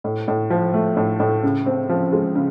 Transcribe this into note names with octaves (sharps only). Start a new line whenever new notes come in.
A2
A2
F3
A3
A2
A2
C#3
C4
F3
G#3
C#3